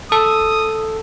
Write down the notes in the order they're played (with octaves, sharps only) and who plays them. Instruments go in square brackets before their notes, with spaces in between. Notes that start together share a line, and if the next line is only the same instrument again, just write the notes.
[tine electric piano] A4 [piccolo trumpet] D#6